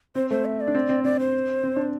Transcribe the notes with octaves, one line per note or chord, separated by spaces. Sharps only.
C4 C5
A3 C5
E5
D5
D4
C4
C4
C4 D5
C5
C4
D4